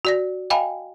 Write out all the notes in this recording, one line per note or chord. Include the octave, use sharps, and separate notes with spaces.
F#4 D5 A#6
D#5 F5 G5 G#5 B5